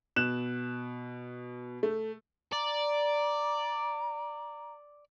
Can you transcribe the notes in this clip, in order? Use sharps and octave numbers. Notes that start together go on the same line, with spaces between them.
B2 F#6 E7
A3
D5 A#5